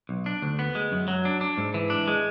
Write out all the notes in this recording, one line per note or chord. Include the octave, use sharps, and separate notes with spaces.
B1
D4
D2
B3
G#3
F#2
F#3
D4
D4
G#2
E3
D4
G#3